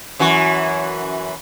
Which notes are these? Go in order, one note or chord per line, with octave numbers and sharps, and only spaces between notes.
F#2 E3 F#4